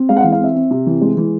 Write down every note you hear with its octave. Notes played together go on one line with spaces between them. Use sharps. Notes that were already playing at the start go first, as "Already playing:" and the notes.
Already playing: C4
G#3 F5
F#5
F5
E3
F5
C4 E5
C4
C3
E3
G#3
E3